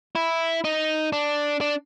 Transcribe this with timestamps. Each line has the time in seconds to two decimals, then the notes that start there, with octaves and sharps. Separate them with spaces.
0.15 E4
0.64 D#4
1.12 D4
1.61 D4